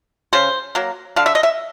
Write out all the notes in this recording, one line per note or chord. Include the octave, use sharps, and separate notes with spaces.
C#3 C5
F#3 A#3
D3 F5
E5
D#5
E5